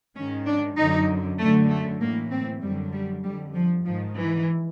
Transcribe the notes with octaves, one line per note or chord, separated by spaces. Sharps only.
G#2 D#3 C#4
D4
F#2 D3 D#4
F#2 D3 A3
A3
A2 E3 A#3
C4
F#2 D3 G3
G3
F2 D3 G3
F3
G#2 D#3 F3
E3